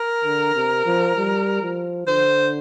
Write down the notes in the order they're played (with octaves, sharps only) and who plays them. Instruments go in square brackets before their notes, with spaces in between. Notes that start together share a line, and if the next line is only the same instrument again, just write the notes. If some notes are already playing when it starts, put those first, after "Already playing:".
Already playing: [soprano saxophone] A#4
[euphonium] D3
C3
F3
G3
F3
[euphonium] D3 [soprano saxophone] C5